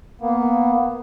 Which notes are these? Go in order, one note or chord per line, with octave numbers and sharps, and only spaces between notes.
A#3 B3